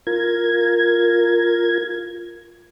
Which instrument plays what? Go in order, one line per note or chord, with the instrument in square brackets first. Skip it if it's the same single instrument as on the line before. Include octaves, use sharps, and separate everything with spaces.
[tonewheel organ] F4 A#4 G#6